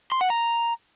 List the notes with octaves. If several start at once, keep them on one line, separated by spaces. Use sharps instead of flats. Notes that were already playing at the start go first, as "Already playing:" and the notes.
C6
F#5
A#5